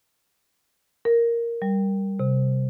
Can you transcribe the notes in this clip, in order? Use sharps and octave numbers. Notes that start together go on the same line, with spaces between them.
A#4
G3
C3